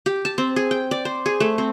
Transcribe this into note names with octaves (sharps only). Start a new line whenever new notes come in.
G4
A5
C4
G#4
G5
D5
C5
G#4
A3
C4